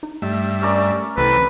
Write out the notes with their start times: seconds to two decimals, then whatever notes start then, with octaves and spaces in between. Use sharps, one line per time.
0.03 D#4
0.22 G2 A3 E5
0.62 C#4 A#4 D5
1.17 C2 C3 E3 A3 B4